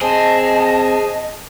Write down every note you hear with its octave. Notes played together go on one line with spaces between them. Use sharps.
C4 G#4 D#5 A5